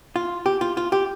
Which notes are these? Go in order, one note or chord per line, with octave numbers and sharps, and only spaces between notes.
F4
G4
F4
F4
G4